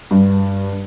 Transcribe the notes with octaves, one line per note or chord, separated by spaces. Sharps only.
G2